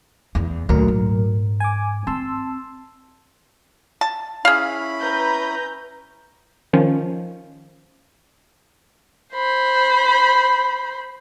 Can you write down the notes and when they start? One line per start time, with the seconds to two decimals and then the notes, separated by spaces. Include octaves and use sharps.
0.35 E2
0.69 D2 A#2 F#3 A#4
0.88 G#2
1.60 G#5 D6
2.07 C4 A5 C6 E6
4.01 A5
4.45 C#4 E4 G#4 F5 B5
5.00 B4 A#5 G6
6.73 D#3 F3 C#4
9.34 C5 B5